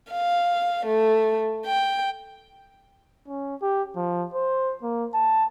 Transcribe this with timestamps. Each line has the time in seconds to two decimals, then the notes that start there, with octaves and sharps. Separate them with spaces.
0.11 F5
0.86 A3
1.66 G5
3.28 C#4
3.62 G4
3.96 F3
4.34 C5
4.83 A#3
5.14 A5